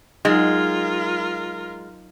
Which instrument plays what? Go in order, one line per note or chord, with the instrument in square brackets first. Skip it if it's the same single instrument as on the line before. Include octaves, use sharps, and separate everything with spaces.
[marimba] F#3 D#4 [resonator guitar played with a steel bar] G#3 [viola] F4 A#4